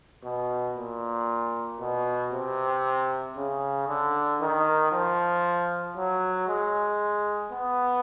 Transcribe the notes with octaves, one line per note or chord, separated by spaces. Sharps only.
B2
A#2
B2
C3
C#3
D3
D#3
F3
F#3
G#3
B3